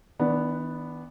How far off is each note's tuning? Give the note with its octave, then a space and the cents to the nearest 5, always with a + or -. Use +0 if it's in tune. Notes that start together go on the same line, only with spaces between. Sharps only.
D#3 +45 B3 +0 D4 +0